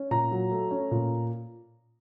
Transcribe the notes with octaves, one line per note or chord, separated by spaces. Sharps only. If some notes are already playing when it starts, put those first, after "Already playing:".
Already playing: C#4
A#2 A#5
F#3
A3
C#4
A#2